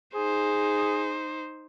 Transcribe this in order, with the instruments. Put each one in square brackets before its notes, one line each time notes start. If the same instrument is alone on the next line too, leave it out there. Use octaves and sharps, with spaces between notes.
[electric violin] D#4 C5 [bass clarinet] G#4